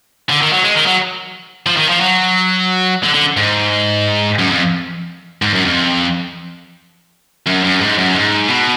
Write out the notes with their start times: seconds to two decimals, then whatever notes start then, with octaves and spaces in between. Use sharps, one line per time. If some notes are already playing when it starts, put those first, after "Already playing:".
0.29 D3
0.41 D#3
0.53 F#3
0.64 G#3
0.75 D#3
0.86 F#3
1.67 F3
1.77 D#3
1.89 F3
2.01 F#3
3.03 D3
3.14 D3
3.37 G#2
4.39 F#2
4.51 F2
5.42 G#2
5.54 F#2
5.65 F2
7.47 F#2
7.64 F#2
7.81 G#2
7.98 F#2
8.15 G#2
8.49 B2